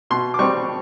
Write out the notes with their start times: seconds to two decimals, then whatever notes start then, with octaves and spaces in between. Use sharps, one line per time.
0.10 B2 C6
0.34 D6
0.39 G3 C4 C#6